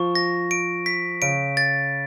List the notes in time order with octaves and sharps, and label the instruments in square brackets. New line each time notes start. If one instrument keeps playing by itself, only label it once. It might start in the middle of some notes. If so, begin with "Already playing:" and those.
Already playing: [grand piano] F3 [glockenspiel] C#6
[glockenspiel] A#6
D7
B6
[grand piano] C#3 [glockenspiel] D7
[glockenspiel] A6